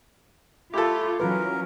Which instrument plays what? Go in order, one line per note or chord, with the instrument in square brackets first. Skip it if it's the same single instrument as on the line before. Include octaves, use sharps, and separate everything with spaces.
[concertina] A3 E4 [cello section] F4 [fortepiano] G4 A4
[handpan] E3 F4 B4 [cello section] F#3 C#4 [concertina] A#4